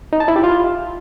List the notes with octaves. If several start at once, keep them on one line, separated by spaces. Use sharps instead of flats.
D#4
A5
E4
G4
F4